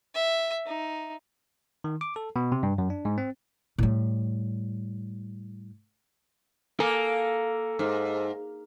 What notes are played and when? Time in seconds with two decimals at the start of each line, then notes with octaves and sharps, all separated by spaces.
0.15 E5
0.66 D#4
1.84 D#3
2.01 D6
2.16 A4
2.36 B2
2.52 C3
2.63 G2
2.78 F#2
2.90 D4
3.05 G#2
3.18 C4
3.78 A2 G3
6.80 A#3 A4 G#5
7.79 G#2